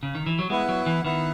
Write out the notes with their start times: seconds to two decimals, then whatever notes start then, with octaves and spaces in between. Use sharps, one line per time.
0.03 C#3
0.15 D#3
0.26 E3
0.39 F#3
0.50 G#3 B3 E4 B4 F#5
0.69 F#3
0.86 E3
1.04 D#3 B3 E4 B4 F#5